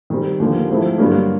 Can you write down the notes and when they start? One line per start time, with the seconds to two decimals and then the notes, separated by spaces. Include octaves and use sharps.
0.10 D#3 G3 C4
0.40 D#2 D3 F3 A#3
0.69 G#2 F3 A3 C4 E4
0.98 G2 D3 F#3 A#3